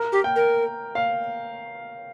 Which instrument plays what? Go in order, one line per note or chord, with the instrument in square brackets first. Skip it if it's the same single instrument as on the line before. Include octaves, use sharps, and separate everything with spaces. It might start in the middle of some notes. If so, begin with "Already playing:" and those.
Already playing: [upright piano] A#4
[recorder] G4
[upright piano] G5
[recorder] A#4
[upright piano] F5